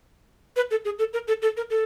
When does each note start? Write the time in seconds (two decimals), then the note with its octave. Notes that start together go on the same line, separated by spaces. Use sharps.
0.56 B4
0.71 A4
0.85 G#4
0.99 A4
1.13 A#4
1.28 A4
1.42 A4
1.57 A#4
1.70 A4